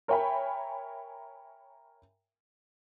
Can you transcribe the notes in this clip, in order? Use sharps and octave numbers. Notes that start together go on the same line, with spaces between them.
A#4 C#5 E5 G5 G#5 B5